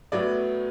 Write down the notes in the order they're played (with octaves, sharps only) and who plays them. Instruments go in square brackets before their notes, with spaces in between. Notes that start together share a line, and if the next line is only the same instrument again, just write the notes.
[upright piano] A2 F#3 B3 D5